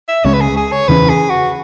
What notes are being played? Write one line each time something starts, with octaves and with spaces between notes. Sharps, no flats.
E5
C#2 C#3 G#3 C#4 C#5
B4
G#4
G#4
C#5
E2 C#3 E3 C#4 B4
G#4
F#4